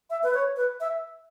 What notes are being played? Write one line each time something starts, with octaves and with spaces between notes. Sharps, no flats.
E5
B4
C#5
B4
E5